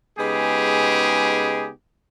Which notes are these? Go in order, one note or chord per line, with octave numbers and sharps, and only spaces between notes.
C#3 G#3 B3 D#4 G4 G#4